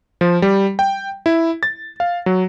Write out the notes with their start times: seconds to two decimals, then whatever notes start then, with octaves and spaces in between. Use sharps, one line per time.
0.21 F3
0.42 G3
0.79 G5
1.26 E4
1.63 A6
2.00 F5
2.26 F#3